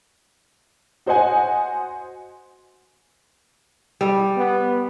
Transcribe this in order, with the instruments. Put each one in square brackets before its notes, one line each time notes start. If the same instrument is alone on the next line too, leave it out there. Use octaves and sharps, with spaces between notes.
[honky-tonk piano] F#4 C5 D#5 F#5 G#5
[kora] G3
[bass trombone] B3